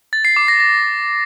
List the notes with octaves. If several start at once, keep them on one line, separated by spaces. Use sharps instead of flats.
A6
C7
D6
A#6
A#6